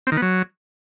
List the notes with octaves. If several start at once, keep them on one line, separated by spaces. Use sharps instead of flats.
C4
D#3
B3
F#3